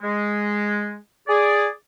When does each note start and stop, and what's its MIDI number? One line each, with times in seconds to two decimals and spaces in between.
0.02 0.95 56
1.28 1.68 68
1.28 1.68 74